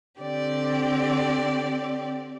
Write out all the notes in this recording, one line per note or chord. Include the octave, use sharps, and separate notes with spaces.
D3 C4 G4 D5